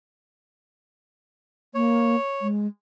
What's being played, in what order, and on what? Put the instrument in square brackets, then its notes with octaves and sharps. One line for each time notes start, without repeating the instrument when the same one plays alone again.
[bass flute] A#3 [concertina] C#5
[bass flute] G#3